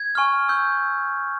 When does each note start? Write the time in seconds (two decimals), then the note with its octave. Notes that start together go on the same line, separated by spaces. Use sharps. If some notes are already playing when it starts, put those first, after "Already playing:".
Already playing: G#6
0.15 G#5 C#6 F6
0.48 C#6 E6 G6